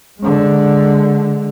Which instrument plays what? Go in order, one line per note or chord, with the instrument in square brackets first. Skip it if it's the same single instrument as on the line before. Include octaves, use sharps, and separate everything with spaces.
[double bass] D3 G#3